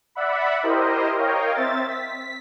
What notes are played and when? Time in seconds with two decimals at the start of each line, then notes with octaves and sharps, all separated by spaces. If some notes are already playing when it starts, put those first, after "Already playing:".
0.15 D5 E5 F#5 B5
0.63 E4 G4 A#4 C5 D#5
1.17 A#4 C#5 D#5 F5 G5
1.55 C4 E5 A6
1.88 B6